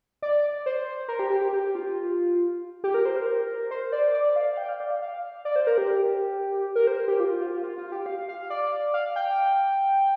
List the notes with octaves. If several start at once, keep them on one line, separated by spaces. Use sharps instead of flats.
D5
C5
A#4
G4
G4
G4
G4
F4
G4
A#4
C5
A#4
C5
D5
D5
F5
G5
F5
D5
F5
F5
D5
C5
A#4
G4
A#4
C5
G4
F4
F4
F4
F4
G4
F5
F5
D5
F5
G5